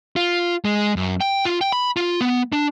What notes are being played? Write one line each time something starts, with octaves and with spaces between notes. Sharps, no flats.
F4
G#3
F#2
G5
F4
G5
B5
F4
B3
D4